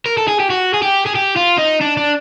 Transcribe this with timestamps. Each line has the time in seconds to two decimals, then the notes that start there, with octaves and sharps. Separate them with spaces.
0.06 A#4
0.17 A4
0.28 G#4
0.40 G4
0.50 F#4
0.74 G#4
0.83 G4
1.07 G#4
1.16 G4
1.37 F4
1.58 D#4
1.81 D4
1.97 D4